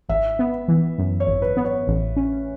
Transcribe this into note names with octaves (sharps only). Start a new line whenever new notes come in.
G#1 E5
B3
E3
F#2
C#5
G#1
B4
B3
C#5
A1
C#4